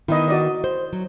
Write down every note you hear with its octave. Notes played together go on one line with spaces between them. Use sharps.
D#3 B3 E4 D#5
F#4 D5 D#5
C5
F#3